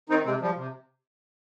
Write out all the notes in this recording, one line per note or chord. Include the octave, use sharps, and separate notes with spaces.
D#3 C4 D#4
C3 G#3 C4
F3 G3
C3